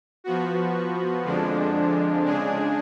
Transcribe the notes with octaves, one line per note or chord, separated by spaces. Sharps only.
F3 B3 F#4
F2 D3 F3 G#3 D4
C#3 G#3 D4 G#4